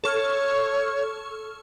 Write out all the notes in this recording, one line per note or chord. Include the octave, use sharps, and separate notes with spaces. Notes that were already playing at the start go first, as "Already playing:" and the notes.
A4 C#5 C#6 F6